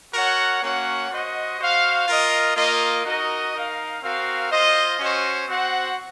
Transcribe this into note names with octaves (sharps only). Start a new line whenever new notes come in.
F#4 A#4 C#5 F#5
A#3 C#4 F#4 C#5 F#5
F#4 C5 D#5
F#4 C5 F5
F4 A#4 D#5
A#3 F4 A#4 D#5
D#4 F#4 A#4 D#5
D#4 A#4 F5
C4 F#4 A#4 F5
F4 C5 D#5
C#4 F#4 C5
C4 F#4 C5 F#5